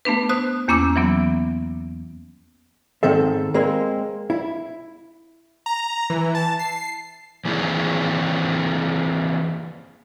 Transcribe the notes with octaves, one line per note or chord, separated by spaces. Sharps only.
A3 B3 D4 B4
C5 D#6 F#6
E2 A#3 C#4 D6 E6
E3 F#3 B3
G#2 D#3 C4 A4 E5
G#3 A#3 C4
E4
A#5
E3
A5
C7
E3 A#3 C4 E4 G#4